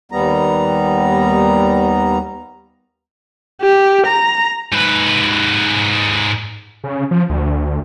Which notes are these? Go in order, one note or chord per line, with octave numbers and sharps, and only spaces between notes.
D#2 G3 B3 A#5
G4
A#5
G#2 B4
C#3
F3
D2